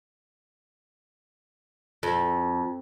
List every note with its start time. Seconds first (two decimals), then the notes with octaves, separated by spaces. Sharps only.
2.03 F2